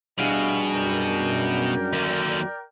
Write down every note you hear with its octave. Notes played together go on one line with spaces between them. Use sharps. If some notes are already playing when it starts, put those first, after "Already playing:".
B2 G3 D4 E4 G#4 D#5 F5
F#2 A#4 D5 G5
D#2 D3